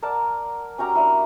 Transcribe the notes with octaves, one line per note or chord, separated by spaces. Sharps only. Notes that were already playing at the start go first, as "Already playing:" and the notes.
A#4 D5 F#5 A5
C#4 F#4 G4 A#5
A#3 D4 E4